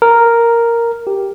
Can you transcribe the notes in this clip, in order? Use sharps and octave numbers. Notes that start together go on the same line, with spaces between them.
A#4
G4